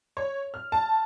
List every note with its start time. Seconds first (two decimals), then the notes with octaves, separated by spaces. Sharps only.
0.17 C#5
0.54 F6
0.72 A5